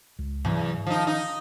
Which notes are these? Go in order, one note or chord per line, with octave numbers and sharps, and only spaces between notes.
C#2
E2 G#2 C3 F#3
D#3 F3 D#4
D#4